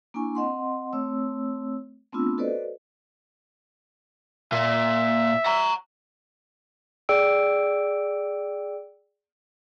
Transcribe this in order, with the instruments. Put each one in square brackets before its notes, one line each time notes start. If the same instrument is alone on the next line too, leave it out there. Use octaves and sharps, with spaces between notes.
[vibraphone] A#3 D4 E4 G#5 C#6
C4 D#5 F#5 C6
A3 C4 C#5 E6
A3 B3 C4 D4 F4 E6
F#4 A4 B4 C5 D5 D#5
[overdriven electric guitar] A#2 A#3 [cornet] E5
[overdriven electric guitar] F#5 A#5
[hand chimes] G#4 D5 G5 E6 D7